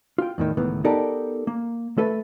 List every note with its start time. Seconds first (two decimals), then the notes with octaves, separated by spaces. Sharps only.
0.18 F4 G5
0.38 E2 A2 D#3
0.57 C#2 A2 D#3 E3 B3
0.84 B3 D#4 G4 A4 A#4 D5
1.47 A#3
1.98 A3 A4 B4 E5